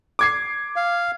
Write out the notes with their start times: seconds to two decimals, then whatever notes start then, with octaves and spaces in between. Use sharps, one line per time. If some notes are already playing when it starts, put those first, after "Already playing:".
0.19 D6 G#6 C7
0.76 F5